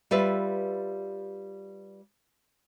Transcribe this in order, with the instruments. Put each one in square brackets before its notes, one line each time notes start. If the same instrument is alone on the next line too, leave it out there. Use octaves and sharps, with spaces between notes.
[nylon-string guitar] G3 F4 B4 E5